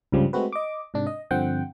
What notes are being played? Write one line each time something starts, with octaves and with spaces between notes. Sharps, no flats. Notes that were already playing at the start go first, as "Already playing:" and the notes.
C#2 G2 C#3 F3 G3
G#3 A3 C4 F#4 B4
D#5 D6
G#2 C3 D4
D#5
G2 D3 F3 C4 F#5 G5